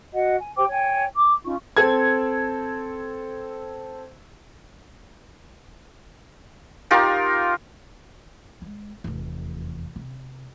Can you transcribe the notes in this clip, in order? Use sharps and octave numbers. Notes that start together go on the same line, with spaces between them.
F#4 D#5 F#5
G#5
G4 C5 G5 D6
C#5 G5 G#5
D6
C#4 D#4 F4 C#6
C4 A4 G#6
D#4 F4 G4 A#4
G#3
F1 E2
C3